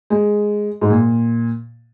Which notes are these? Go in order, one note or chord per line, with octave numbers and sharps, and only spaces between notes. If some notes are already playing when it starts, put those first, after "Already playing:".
G#3
G#2
A#2